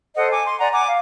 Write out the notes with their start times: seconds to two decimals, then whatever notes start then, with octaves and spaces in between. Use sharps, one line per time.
0.16 A4 C5 D#5 F#5
0.32 G#5 D6
0.46 C6
0.60 D5 F#5 G#5 A#5
0.72 F#5 G#5 D6
0.87 F5